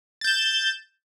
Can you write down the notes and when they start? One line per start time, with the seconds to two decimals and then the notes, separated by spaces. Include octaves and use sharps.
0.21 A6
0.24 G6
0.27 E7